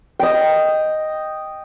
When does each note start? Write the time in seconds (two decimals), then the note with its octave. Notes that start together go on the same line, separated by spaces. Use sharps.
0.20 D#5 G5